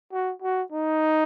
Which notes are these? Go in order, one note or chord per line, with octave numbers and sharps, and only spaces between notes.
F#4
F#4
D#4